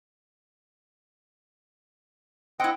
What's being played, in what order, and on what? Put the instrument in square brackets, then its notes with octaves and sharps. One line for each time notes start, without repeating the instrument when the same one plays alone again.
[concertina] C4 D#5 F#5 [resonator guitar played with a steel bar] E4 G5